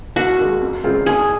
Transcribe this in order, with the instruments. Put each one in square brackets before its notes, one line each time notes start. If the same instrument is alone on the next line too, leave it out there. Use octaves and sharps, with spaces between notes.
[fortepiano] D#2 [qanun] F#4
[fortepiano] D#3 G#3
F2
C#3 G#3 C4 F4
[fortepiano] D#2 [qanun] G#4